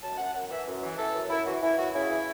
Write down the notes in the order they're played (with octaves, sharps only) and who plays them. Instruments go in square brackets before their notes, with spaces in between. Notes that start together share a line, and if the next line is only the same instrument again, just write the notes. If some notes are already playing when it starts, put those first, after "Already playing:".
[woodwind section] F#2 A5
F#2 F#5
F#2 F#5
E3 E5
F#2
E3
E3 A4
F#2
F#2 E4
E3 F#4
E3 E4
F#2 F#4
C#3 E4
E3